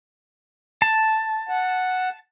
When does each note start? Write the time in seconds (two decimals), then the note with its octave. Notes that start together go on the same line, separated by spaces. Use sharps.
0.82 A5
1.49 F#5